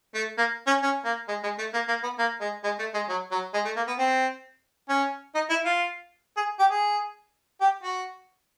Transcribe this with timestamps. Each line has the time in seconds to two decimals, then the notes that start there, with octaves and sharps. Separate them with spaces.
0.15 A3
0.38 A#3
0.67 C#4
0.83 C#4
1.05 A#3
1.28 G#3
1.43 G#3
1.58 A3
1.74 A#3
1.88 A#3
2.03 B3
2.19 A#3
2.41 G#3
2.64 G#3
2.79 A3
2.94 G#3
3.09 F#3
3.31 F#3
3.54 G#3
3.65 A3
3.76 A#3
3.87 B3
3.99 C4
4.89 C#4
5.35 D#4
5.50 E4
5.65 F4
6.37 G#4
6.59 G4
6.70 G#4
7.61 G4
7.83 F#4